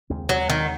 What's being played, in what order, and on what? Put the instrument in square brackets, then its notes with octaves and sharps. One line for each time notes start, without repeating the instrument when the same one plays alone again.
[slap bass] D#2 C#3 G#3 C4
[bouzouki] F#3
D#3